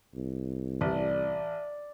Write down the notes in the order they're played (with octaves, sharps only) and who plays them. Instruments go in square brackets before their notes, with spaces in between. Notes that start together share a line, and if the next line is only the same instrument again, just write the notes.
[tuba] C2
[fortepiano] A1 [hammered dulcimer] D5